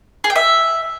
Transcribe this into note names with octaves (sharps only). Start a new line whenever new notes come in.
G#4
G5
E5